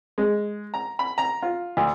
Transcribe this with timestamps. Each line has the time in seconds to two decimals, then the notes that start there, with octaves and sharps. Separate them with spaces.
0.18 G#3
0.74 A#5
0.99 B5
1.18 A#5
1.42 F4
1.77 D2